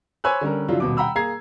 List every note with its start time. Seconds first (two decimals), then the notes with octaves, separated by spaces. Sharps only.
0.24 C5 C#5 G#5 B5 E6 F#6
0.41 D3 G3 C#4 A#4
0.69 C#3 F3 F#3 D4 E4 F4
0.80 D#1 B2 D6
0.97 F#5 G5 A#5 B5 E6
1.15 A#3 G#4 A#5 G#6 C7